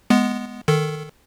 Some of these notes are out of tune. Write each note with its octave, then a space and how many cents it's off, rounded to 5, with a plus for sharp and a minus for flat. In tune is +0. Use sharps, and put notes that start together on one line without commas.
G#3 +0 B3 +0
D#3 -5 A4 +0